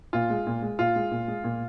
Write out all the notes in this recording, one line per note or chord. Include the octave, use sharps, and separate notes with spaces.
A#2 F4
G#3
A#2
G#3
A#2 F4
G#3
A#2
G#3
A#2